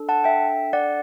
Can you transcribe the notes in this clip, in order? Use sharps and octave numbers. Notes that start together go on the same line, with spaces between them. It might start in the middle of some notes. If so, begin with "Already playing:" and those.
Already playing: D4 A4
F#5 A5
E5 G5
D5 F#5